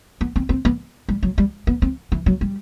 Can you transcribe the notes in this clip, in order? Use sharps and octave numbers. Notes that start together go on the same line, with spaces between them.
B3
C4
C4
B3
G3
F#3
G3
B3
C4
E3
F#3
G3